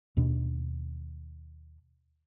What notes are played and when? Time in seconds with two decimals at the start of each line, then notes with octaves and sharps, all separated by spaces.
0.17 D#2 B2 D4